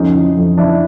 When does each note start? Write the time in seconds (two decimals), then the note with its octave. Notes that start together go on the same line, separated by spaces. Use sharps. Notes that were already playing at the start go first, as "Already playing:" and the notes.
Already playing: F2 C#4 D#4
0.15 E3
0.37 F2
0.57 E3 D4 E4